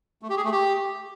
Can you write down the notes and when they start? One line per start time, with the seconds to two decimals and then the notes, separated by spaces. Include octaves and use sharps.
0.22 A3
0.30 G4
0.37 G#4
0.44 A3
0.52 G4